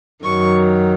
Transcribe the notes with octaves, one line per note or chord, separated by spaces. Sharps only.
F#2 D#3 F#3 C#6